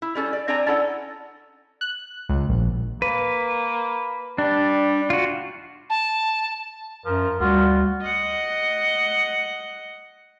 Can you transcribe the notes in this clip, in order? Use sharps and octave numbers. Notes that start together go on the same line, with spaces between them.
E4
G3 C#4 A4
D5
C4 D4 D5 G#5 A#5
C#4 E4 A4 F#5
F#6
C#2
A#1
A#3 B4
G3 D4
F4 F#4
A5
F#2 F3 A#4
D2 G3 F4 F#4
D#5 F#5